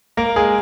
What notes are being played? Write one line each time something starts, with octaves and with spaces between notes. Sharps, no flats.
A#3 A#4
G#3 G#4